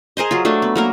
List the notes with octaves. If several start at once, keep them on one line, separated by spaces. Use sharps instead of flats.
G#4 A#4 C5 D#5
F#3 F4
F#3 A3 D4
B3
F#3 A#3 A#4